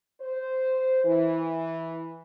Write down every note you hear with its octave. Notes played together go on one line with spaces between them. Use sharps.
C5
E3